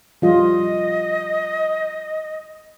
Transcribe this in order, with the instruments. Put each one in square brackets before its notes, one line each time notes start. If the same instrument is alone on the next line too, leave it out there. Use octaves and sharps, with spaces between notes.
[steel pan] F3 G3 F4 [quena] D#5